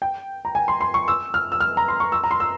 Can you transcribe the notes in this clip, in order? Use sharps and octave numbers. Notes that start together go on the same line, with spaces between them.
G5
A#5
G#5
C6
C6
C#6
E6
F6
E6
F6
A#5
C6
C#6
E6
A#5
C6
E6